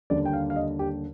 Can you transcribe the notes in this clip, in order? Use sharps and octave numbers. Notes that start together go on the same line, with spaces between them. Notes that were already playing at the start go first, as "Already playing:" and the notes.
D#2 D3 G3 D4 D5
G5
F5
F5
D#5
G4